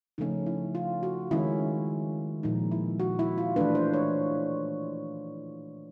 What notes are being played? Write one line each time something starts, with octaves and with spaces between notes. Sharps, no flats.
C#3 F3 A3 C#4 D#4
E4
F4
F#4
D#3 G#3 C#4 E4
A#2 F3 G#3 D#4
E4
F#4
E4
F4
E3 A3 D4 B4
C5
C#5